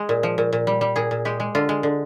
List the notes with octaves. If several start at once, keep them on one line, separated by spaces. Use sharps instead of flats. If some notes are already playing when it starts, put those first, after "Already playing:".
Already playing: G#3 G#4
A#2
F3
A#2
A#2
G3
G3
A#2 G#4
A#2
G#3 G4
G#3
D3 F4
G#3
D3